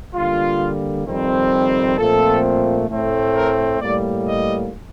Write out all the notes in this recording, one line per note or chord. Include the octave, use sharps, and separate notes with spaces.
D3 G3 A#3 F4
F2 D#3 G3 C4
A#2 F3 A3 C4 A4
A2 A3 C4
A#4
A2 G3 A#3 D5
D#5